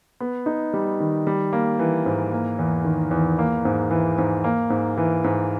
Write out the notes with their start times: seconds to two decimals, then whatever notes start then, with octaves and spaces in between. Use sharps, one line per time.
0.20 B3
0.46 D#4
0.74 G3
1.00 D#3
1.27 G3
1.53 A#3
1.79 E3
2.06 G#2
2.32 A#3
2.59 E2
2.85 D#3
3.11 E2
3.39 A#3
3.65 G#2
3.91 E3
4.18 G#2
4.44 A#3
4.70 G#2
4.97 E3
5.24 G#2